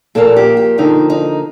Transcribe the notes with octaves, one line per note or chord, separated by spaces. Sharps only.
A#2 F3 A#3 A4
G4
G4
F2 D3 F3 A#3 D#4
D#4